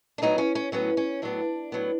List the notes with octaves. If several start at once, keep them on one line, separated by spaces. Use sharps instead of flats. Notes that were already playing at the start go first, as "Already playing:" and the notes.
D4
A2 F#3 B3 D#4
C#4
C#4
A2 F#3 B3 C#4
C#4
A2 F#3 B3 D4
A2 F#3 B3